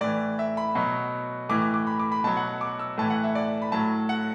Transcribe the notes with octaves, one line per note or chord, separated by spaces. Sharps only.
A2 E3 D5
E5
B5
B2 F#3
A2 E3 D6
D6
D6
B5
D6
B5
B2 F#3 A5
F#5
D6
E6
A2 E3 A5
F#5
E5
D5
B5
A2 F#3 A5
F#5